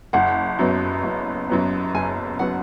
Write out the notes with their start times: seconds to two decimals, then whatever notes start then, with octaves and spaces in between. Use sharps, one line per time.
0.13 F#1 F#5
0.59 F#2 F#3 B3
1.03 F#1
1.50 F#2 F#3 B3
1.94 F#1 G#5
2.39 F#3 B3 F#5